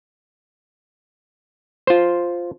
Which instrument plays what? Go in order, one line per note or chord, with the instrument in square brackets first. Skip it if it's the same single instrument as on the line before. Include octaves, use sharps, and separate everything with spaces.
[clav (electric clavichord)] F4 C5